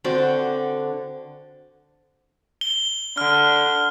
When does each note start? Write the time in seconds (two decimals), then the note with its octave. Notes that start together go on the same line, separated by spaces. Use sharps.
0.04 D3 C4 F#4 D5
2.61 G7
3.17 D3 F6